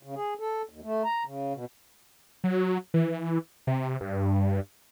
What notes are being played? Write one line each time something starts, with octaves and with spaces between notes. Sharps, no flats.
C#3
G#4
A4
D#2
A3
A#5
C#3
B2
F#3
E3
C3
G2